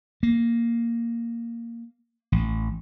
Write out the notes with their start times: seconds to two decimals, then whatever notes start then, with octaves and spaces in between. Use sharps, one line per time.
0.23 A#3
2.32 A1